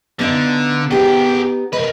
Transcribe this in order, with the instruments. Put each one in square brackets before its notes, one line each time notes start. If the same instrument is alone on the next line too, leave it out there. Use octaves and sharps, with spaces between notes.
[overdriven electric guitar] D3 [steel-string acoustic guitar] B3 D#4 F5
[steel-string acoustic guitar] B3 D#4 G4 [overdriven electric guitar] G#4 G5
[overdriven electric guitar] A#4 B4 [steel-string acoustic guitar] D#5